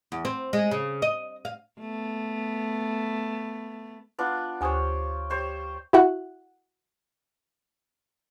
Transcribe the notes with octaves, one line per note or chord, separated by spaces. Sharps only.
E2
C4
G#3
C#3
D#5
F5
A3 B3
B3 D4 F4
D2 G4 C5 C#5 G#5 D#6
G3 C5 C#5
E4 F#4 F#5